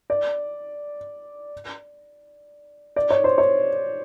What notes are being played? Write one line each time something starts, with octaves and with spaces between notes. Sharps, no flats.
D5
D5
C#5
C5
C#5